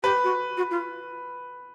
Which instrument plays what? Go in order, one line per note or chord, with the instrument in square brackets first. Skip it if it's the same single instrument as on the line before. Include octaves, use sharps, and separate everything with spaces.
[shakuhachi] G4 [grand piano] B4
[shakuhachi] F#4
F#4
F4